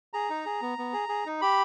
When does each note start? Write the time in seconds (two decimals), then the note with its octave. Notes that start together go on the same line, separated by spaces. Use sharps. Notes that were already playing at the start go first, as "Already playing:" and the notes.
0.13 G#4 A#5
0.30 D#4
0.45 G#4
0.62 B3
0.78 B3
0.93 G#4
1.09 G#4
1.26 D#4
1.41 G4 B5